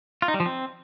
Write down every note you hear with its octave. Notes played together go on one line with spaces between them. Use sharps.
F4
D#4
G3
F3
C4